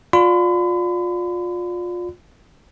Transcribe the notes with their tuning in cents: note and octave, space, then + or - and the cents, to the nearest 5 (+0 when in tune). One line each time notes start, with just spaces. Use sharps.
F4 +25 D5 +0 B5 +40